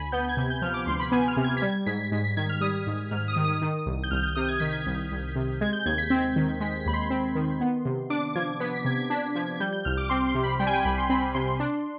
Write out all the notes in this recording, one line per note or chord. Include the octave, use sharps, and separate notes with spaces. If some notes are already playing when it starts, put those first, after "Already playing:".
Already playing: D2 G#5 B5
B3 G6
G#6
C3
G6
F3 F6
D6
D2 C6
B5
B3 G#5
F6
C3
G#6
B6
G3 G#6
G#2 B6
G#2 B6
B6
D#3 G#6
F6
G3 D#6
G#2
G#2 F6
D#6
D#3
D#6
D#3
C2
G6
C2 F6
G6
C3 D#6
G#6
D#3 B6
G#6
C2
C2
C3
G#3 G#6
G6
D#2 G#6
B6
C4
D#3
G#3 B6
B6
D#2 B5
C6
C4
D#3
B3
C3
D4 D6
F3 G#6
B3 B6
B6
C3 G#6
G#6
D4 B6
F3 G#6
G#6
G3 G6
G6
C2 F6
D6
C4 C6
C6
C3
B5
G3 G5
G#5
G5
C2 B5
C6
C4 B5
C3 C6
D4